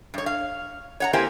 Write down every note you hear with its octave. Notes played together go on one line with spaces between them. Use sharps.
G2 C#5
F5
C#5 F#5 A#5
A#3 C4 E4 G4 C5 G#5